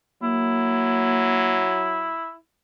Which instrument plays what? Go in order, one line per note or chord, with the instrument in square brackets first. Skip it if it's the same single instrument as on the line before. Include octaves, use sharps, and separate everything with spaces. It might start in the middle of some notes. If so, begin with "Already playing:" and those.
[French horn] F#3 [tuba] A#3 [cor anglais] E4